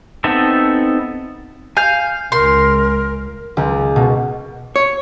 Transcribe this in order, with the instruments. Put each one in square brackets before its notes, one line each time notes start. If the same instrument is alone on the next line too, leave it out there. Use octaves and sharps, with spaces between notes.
[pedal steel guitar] B3 C4 D#4 A4 E5
[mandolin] F5 [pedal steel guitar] G#5 G6
[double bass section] C#2 [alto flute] A#4 [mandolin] C6
[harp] C#2
B2
[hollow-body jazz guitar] C#5